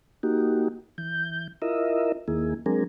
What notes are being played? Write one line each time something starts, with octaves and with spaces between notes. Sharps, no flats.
A#3 D#4 F#4 G4
E3 G6
E4 F4 A#4 D#5 E5
D#2 D#3 A#3 E4 G#4
F#3 G#3 C4 D4 G#4 A#4